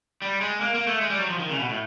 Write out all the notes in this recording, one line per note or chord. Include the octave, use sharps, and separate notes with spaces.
G3
G#3
A#3
A#3
A3
G#3
G3
F#3
F3
D#3
C#3
B2
A2